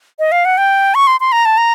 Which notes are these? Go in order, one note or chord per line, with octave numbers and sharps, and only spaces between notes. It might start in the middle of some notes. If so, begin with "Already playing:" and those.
D#5
F5
F#5
G5
C#6
C6
C6
A#5
A5
A#5